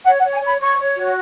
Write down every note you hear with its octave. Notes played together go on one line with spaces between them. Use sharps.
C#5 F#5
F#5
C#5
G#5
C#5
B5
C#5 C#6
C#5
F#4